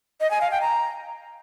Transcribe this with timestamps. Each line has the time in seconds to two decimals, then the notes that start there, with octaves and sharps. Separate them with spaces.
0.21 D#5
0.31 G#5
0.41 F5
0.51 G5
0.61 A#5